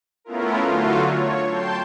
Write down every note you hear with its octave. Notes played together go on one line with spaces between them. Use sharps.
A3 B3 C#4 E4 F4 A#4
D3 F#3 A3 F4 F#4
C#5
G5 A5 C6 G6